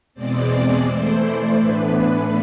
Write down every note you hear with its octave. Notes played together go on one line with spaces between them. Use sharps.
E2 B2 G#3 C4 D5
E3 A3 E4 C5
D5
A2 E3 B3 D4 B4